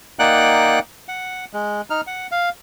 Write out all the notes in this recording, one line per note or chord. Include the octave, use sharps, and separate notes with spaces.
A#3 D#4 D5 F#5 G5 F#6
F#5
G#3
D#4 F6
F#5
F5